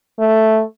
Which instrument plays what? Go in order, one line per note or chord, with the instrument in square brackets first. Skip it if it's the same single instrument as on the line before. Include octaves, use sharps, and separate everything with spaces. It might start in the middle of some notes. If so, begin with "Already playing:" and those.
[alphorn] A3